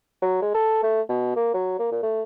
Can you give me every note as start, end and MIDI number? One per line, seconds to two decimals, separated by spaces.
0.22 0.37 54
0.42 0.53 56
0.55 0.82 69
0.83 1.01 57
1.09 1.33 47
1.36 1.51 58
1.54 1.75 54
1.79 1.88 58
1.91 1.99 46
2.03 2.23 57